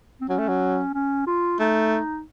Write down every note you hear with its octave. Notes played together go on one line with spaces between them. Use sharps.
C4
F#3 C#4
A3
F#3
C#4
F4
A3 D#4